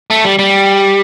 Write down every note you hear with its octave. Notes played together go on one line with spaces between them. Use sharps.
A3
G3
G3